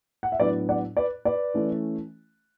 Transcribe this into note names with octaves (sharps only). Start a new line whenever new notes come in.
F#5
E5
A2 F#3 B3 D4 B4 D5
D5 F#5
B4 D5
B4 D5
E3 A3 C#4